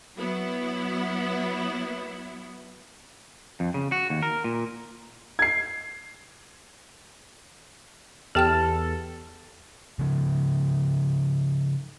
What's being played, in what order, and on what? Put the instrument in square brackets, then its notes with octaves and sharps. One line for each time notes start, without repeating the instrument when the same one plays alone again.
[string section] F#3 B3 E4
[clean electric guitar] F2
C#3
F#4
D#2
A#4
A#2
[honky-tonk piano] G#6 C7
[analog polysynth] E2 A4 [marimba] G4 G5 F6
[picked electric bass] C#3 F3